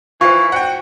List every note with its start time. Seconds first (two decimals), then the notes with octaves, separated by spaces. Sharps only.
0.21 E3 F4 C5 C#6
0.52 F#4 F#5 G5